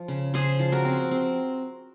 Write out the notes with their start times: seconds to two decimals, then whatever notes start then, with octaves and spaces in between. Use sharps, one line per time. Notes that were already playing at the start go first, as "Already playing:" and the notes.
Already playing: F3
0.08 C#3
0.34 C#3 G#4 C5
0.59 F3
0.72 F#4 A#4
0.85 C4
1.11 C4